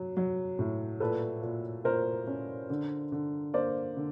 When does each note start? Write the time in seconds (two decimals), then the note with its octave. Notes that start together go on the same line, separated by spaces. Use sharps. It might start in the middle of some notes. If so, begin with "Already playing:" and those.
Already playing: F#3
0.17 F#3
0.59 A2
1.00 A#2 A4 B4
1.42 A#2
1.84 A#2 A#4 C5
2.27 C#4
2.70 D3
3.12 D3
3.54 A#3 C5 D5
3.96 D3